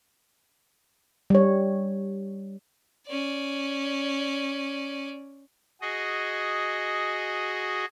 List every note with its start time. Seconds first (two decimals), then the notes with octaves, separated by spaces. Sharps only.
1.30 G3 C#5
3.07 C#4 D5
5.81 F#4 G#4 D#5